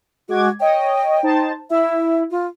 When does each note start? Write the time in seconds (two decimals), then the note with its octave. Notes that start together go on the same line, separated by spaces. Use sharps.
0.29 G#3 F#4 D6 G#6
0.60 C#5 D#5 G5
1.23 D#4 C5 A5
1.70 E4 E5
2.31 F4